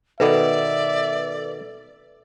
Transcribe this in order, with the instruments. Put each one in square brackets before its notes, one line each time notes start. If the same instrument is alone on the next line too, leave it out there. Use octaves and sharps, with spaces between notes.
[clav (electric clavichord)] B2 D#3 B3 [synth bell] A4 B4 [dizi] D5 [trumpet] E5